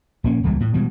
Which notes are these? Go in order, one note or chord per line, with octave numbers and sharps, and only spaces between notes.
A#1 A#3 C#4
D#1 C#2 E3 G3
A2
B2 E3 G3 G#3